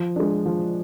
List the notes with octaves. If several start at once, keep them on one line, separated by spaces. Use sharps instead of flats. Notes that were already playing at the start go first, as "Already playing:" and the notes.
Already playing: F3
G#3 D4
F3